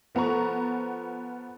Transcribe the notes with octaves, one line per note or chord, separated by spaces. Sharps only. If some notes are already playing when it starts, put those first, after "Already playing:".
F3 B3 A4 A#5 C#6